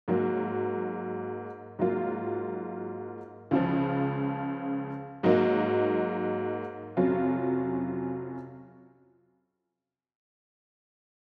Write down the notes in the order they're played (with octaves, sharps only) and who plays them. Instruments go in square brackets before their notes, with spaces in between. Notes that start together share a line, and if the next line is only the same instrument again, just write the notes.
[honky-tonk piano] G#2 F#3 A#3
G#2 F#3 A#3 F4
C#2 C#3 F3
G#2 F#3 A#3 D#4
F2 C3 F#3 C#4 F4